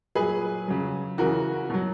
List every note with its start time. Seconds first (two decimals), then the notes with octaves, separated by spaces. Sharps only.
0.15 A#2 F#3 G#4 B4
0.68 C#3 F#3
1.18 C#3 E3 F#4 A#4
1.70 B2 F#3